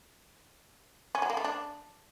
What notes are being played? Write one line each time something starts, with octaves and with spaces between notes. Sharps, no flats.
C#4
F#3
A#3
A3
D4